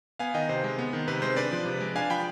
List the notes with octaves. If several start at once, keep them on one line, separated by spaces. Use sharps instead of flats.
B3 F5 G#5
D#3 D#5 G5
C3 C5
G#3
B3
D#3
C3 B4
G#3 C5
D4 B4 D5
F3
C3
G#3
D4 F5 G#5
F3 G5 B5